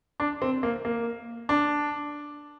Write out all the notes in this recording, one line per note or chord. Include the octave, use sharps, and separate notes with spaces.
D4
C4
A#3
A#3
D4